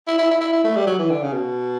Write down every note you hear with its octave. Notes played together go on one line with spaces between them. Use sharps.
E4
E4
E4
E4
E4
A3
G3
F#3
E3
D3
C#3
B2